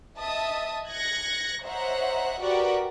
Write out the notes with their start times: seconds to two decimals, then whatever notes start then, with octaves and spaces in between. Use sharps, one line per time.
0.19 D#5 E5 A5 D#6
0.88 F#6 G#6 A#6 C#7
1.64 C5 C#5 D#5 E5 F#5 A#5
2.42 F#4 G4 A#4 B4 D5 F#5